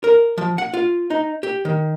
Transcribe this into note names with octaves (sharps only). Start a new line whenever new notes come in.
A#4
F3
F#5
F4
D#4
G4
D#3